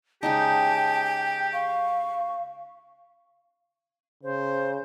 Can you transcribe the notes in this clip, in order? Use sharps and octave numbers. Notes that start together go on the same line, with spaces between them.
C#3 G#3 D#4 G4 G5 A5
F5 C#6
C#3 C5